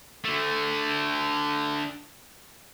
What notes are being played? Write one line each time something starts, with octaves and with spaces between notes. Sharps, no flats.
D3 A3